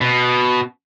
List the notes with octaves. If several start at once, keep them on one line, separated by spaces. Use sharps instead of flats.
B2